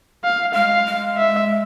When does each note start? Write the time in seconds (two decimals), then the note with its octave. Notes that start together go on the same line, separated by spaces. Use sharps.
0.24 F5
0.54 G#3 F5
0.86 G#3
1.17 E5